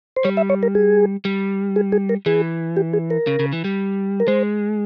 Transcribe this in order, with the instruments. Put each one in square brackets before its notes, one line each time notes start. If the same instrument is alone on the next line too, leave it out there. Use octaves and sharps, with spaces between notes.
[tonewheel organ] C5
[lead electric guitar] G3 [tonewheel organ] C#5
[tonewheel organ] E5
C#5
A#4
G#4
[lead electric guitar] G3
[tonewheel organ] G#4
G#4
A#4
[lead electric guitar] E3 [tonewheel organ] G#4
[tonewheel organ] G4
G#4
A#4
[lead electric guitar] C#3
C#3
E3
G3
[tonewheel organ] A#4
[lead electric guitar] G#3 [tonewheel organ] C5